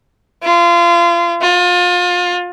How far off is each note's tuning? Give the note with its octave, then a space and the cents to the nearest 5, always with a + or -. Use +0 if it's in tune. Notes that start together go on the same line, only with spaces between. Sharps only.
F4 -30
F4 +30